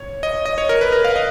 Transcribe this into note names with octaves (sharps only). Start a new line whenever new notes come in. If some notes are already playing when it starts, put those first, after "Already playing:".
Already playing: C#5
D#5
D#5
C#5
A#4
B4
A#4
F5
D#5